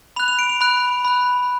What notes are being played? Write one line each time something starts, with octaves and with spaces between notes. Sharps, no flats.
B5 F#6 F7
F7
D7
F7
B5 F#6
B5 F#6